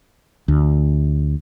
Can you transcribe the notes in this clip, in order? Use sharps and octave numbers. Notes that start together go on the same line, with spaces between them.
D2